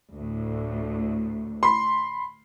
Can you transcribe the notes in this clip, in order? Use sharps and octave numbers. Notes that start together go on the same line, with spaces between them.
D2 A2
B5 C6